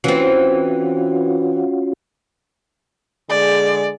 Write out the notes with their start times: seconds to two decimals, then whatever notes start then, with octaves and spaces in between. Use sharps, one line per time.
0.04 E3 C4 C#4 F4 F#4
3.30 D3 G#3 G#4 D5